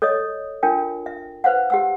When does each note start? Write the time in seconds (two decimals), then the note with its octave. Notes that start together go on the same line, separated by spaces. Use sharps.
0.02 A4 C#5 D#5 D#6
0.63 D4 F4 A#4 G5
1.06 E5
1.44 B4 C5 F5 F#5
1.70 G4 F#5 E6